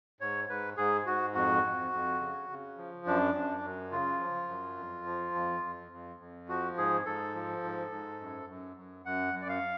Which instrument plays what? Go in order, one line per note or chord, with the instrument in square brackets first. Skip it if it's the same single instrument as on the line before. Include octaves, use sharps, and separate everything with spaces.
[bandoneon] G#2 C#5
G#2 B4
G#2 G#4
G#2 F#4
F2 F#4
F2
F2
C#3
C#3
F3
F#2 D4
F#2
F#2
C#3 F4
F3
F#2
F2
F3
F2
F2
F2
F2
F3 F#4
G#2 G#4
G#2 A4
F3
G#2
G#2
F#2
F#2
F#2
F#2 F#5
F#2
D5
F5